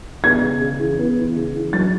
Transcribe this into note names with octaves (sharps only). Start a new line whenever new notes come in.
B3 G#6
C#3
C#3
E3
B3
E3
C#3
E3
F#3 A6